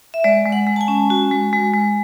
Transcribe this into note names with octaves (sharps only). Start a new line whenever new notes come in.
E5
G#3 D5
G#3
F#5
G#3
A5
G#5
C#4
F#4
G#3
G#3
G#3